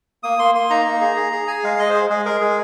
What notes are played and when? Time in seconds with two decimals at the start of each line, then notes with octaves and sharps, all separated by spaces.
0.23 A#3 D#6
0.39 A#3 C6
0.55 A#3 C6
0.70 D#4 A#5
0.85 A#3
1.00 G#4
1.16 G#4
1.32 G#4
1.47 G#4 G#5
1.64 G#3 F5
1.79 G#3 D#5
1.90 G#4 C5
2.10 G#3 G#4
2.26 G#4 A#4
2.40 G#3 G#4